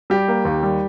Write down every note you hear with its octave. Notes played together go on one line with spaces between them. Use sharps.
G3 G4
A#3
D#2
G3